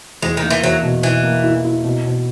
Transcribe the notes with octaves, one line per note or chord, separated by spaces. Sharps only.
E2 G#3
D#3
A#3
E3
E2 F#3
B2
B2 E3
A#3
E4
E4
B2
B2